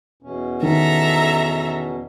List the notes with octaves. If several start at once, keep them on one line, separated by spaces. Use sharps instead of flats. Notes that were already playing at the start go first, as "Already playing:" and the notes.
E2 B2 C#4
D#3 A4 E5 A#5